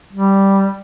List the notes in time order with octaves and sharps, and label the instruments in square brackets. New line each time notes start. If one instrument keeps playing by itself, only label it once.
[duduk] G3